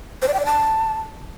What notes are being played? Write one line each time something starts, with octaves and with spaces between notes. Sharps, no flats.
C5
D5
G5
D5
A5